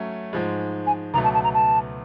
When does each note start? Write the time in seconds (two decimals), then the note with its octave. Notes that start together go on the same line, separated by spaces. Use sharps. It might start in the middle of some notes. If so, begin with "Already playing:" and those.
Already playing: F#3 A3 C#4
0.33 G#2 F3 G#3
0.87 G#5
1.14 C#2 B2 F#3 A3 A#5
1.24 A5
1.34 A5
1.44 A#5
1.54 A5